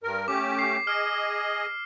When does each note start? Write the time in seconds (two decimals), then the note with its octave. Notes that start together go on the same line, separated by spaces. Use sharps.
0.03 G2 A#4
0.28 A3 C#4 G4 D6
0.59 C7
0.87 G#4 D#5 F6